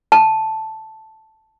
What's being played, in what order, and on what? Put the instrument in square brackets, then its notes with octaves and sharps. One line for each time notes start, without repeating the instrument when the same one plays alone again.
[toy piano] A5